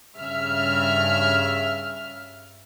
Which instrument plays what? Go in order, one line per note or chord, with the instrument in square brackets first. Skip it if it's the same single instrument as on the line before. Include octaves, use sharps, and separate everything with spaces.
[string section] G2 C#3 E5 F6